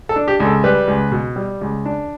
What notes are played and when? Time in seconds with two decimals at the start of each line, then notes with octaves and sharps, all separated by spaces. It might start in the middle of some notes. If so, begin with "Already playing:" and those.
0.09 A4
0.16 D4
0.28 G4
0.40 C#2
0.45 A4
0.64 G3 B4
0.88 C#2
1.12 B2
1.36 G3
1.61 C#2
1.85 D4